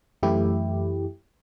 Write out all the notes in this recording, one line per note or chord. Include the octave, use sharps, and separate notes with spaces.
F#2 E3 A3 E4 G4